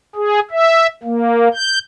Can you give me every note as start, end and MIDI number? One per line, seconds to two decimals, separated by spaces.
0.15 0.39 68
0.51 0.87 76
1.03 1.48 58
1.54 1.79 91